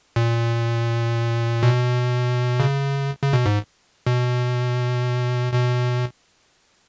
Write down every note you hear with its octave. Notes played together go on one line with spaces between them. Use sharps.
A#2
B2
C#3
C#3
B2
G#2
B2
B2